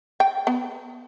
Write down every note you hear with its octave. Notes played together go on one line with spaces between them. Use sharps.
G5
B3